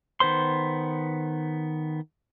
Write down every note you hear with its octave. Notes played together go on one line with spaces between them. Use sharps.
D#3 B3 C5 C6